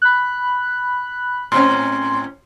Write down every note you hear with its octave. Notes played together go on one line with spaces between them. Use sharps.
B5 F#6
A2 C4 C#4 C6